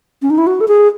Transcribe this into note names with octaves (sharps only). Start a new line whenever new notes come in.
C#4
D#4
E4
F#4
A4
G#4